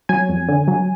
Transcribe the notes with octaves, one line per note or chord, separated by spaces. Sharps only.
F#3 G#5
F2
D3
F#3